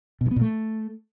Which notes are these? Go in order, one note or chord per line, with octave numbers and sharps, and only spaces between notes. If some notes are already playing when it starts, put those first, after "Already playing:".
B2
G2
B3
A#2
A3